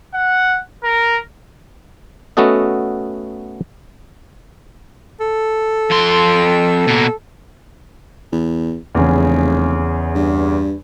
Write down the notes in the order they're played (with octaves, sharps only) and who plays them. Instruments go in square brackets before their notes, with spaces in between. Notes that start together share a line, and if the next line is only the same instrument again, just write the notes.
[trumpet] F#5
A#4
[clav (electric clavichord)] A3 B3 C#4 F#4 A4 D#5
[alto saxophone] A4
[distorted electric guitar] F2 C6
B2 A#3
[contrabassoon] E2
[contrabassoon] F1 [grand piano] E2 C#3
[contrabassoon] G2